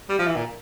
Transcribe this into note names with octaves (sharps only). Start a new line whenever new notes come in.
G3
F3
E3
A#2